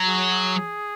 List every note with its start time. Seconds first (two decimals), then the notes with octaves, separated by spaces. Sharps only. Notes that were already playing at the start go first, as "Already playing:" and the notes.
Already playing: F#3
0.08 G#4